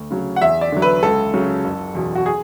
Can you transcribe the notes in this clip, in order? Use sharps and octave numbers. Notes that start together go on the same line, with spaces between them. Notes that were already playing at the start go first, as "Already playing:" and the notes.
Already playing: D2
C#3 F#3
F#5
E2 E5
D5
D3 F#3
B4
C#2 A4
C#3 F#3
F#1
E2 B2
F#4
G#4